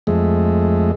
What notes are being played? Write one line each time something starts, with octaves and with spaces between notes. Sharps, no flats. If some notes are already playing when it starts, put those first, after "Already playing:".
F2 G#3 A3